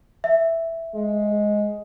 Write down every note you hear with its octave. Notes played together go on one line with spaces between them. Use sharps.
E5
G#3